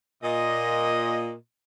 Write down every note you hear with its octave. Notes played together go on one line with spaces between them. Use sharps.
A#2 D#5